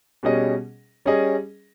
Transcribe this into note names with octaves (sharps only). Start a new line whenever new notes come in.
B2 G3 C#4 G#4 D#5
G3 C#4 G#4 D#5